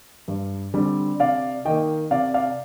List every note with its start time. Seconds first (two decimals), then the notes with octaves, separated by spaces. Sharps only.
0.28 G2
0.74 D3 G3 C4
1.20 C3 D5 F5
1.65 D#3 A#3 D#5 G5
2.11 C3 D5 F5
2.34 D5 F5